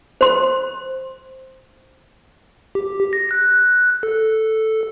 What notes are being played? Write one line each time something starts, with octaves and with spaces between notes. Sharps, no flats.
C5 C6
G4
A#6
F#6
A4